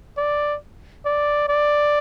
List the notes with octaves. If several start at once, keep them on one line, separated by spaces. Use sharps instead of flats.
D5
D5
D5